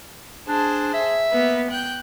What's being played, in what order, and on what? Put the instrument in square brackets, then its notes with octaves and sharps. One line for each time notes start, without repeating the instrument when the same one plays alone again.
[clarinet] D4 [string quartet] G#4 C5 A5
[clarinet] E5
[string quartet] A#3 B3 B4
G5 F#6 G6